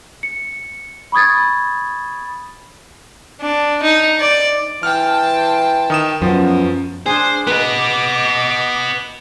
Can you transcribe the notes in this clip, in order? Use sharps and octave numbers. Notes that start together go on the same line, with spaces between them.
C#7
B5 C#6 D#6 G#6 A6
D4
D#4
D5
E3 G5 A5 C6 F6
D#3 D#6 E7
F#2 F3 B3
D4 G#4 C5
B3 B4 D#5 D6